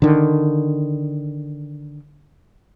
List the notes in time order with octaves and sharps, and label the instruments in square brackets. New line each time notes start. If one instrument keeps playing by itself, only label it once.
[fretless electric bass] D3 D#3